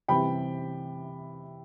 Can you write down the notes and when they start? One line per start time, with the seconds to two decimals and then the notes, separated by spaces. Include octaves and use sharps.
0.08 C3 E3 G3 G5 B5